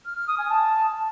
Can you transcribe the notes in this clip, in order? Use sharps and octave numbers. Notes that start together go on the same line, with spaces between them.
F6
F6
D#6
G#5
A5